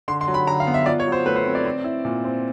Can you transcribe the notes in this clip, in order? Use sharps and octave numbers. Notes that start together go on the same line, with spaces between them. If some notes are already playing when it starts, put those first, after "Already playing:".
D3 C6
C6
F#3
B5
D3 A#5
F5
B3
E5
F4 D5
C#5
F#3
C5
A3 B4
C5
C4
D5
C4
E4
A#2
C4